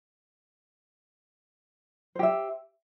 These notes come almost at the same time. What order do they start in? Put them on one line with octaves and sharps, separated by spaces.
C5 G4 E5